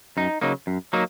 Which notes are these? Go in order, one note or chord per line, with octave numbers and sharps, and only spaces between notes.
F#2 D#4
C#3 F#3 A#3 D#4
F#2
F#3 A#3 D#4